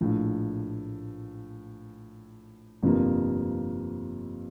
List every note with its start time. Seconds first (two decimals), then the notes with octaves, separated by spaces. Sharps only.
0.01 A#1 A2 F3
2.83 G1 F2 C3 F3 A#3